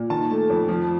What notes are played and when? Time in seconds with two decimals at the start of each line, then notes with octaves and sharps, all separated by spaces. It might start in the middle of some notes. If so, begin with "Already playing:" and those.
Already playing: A#2
0.10 D#3 A5
0.30 A3
0.50 F2
0.68 F3